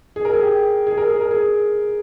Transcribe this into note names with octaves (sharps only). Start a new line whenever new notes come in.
G#4
A#4
G#4
G4
G#4
A#4
G#4
A#4
G#4